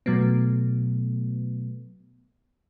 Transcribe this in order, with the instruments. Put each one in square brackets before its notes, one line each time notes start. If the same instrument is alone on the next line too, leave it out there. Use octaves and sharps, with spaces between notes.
[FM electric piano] B2 F#3 A3 B3